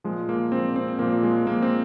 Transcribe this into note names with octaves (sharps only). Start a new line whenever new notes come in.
A#2 F3 G#3
A#3
A#2 F3 C4
C4
A#2 F3 A#3
G#3
A#2 F3 A#3
C4